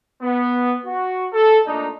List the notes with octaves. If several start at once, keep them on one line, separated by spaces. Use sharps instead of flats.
B3
F#4
A4
A#2 A3 D4 D#4